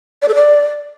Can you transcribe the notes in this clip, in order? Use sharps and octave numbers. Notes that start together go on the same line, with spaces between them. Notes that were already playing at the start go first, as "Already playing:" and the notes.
D5
A4
D5